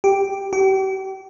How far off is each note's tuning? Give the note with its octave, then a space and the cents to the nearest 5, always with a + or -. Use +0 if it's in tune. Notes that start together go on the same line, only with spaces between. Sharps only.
G4 +0
G4 -40